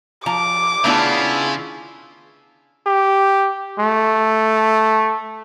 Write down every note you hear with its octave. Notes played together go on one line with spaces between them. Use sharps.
F3 A#5 D6
C#3 A3 B3 D4 E4 F4
G4
A3